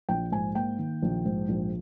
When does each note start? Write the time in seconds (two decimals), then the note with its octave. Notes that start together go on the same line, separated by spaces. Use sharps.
0.09 A#1 G5
0.32 G#2 G#5
0.55 A#3 G5
0.79 D#3
1.03 A#1
1.25 G#2
1.49 A#1